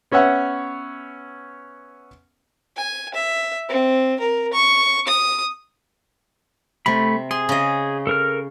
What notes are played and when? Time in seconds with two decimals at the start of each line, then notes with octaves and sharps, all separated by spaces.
0.12 B3 C#4 C#5 E5 F#5
2.77 G#5
3.14 E5
3.69 C4
4.20 A#4
4.53 C#6
5.07 D#6
6.86 C3 A3 B5
7.31 G#4 C6
7.49 C#3 D#5
8.07 A4 A#4 F6